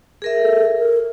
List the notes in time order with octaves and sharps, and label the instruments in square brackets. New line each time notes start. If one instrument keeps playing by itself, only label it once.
[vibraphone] G#4 A#4 E5
[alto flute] A4
A#4